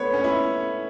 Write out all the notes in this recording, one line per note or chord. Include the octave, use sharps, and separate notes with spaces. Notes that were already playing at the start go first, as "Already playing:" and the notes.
Already playing: A3 B3 B4 C#5
C#4
E4